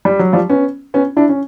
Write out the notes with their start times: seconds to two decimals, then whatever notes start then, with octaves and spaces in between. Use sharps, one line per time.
0.05 G3
0.19 F#3
0.33 F3 G3
0.50 B3 C#4
0.94 B3 C#4
1.17 D4 E4
1.29 C#4